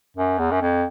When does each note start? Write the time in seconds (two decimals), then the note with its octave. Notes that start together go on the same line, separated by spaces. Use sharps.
0.17 F#2
0.39 E2
0.51 F#2
0.61 F2